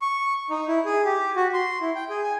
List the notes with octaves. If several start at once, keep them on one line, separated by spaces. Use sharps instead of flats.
C#6
D#4
E4
G#4
G4
F#4
C6
E4
G5
G#4
G#5